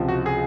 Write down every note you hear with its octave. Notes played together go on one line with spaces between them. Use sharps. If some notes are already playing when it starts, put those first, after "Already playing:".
Already playing: C#2 C3 F3
F#4
G#4